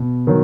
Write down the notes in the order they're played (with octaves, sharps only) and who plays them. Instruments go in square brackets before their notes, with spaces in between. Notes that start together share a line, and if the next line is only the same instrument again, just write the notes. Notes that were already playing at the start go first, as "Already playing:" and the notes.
Already playing: [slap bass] B2
[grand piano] D#3 F#3